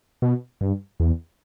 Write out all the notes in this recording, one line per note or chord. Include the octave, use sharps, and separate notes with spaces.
B2
G2
E2